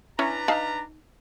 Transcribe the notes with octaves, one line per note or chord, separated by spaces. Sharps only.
C#4 D4 E4 B4 A#5
D#4 F5 A5 F6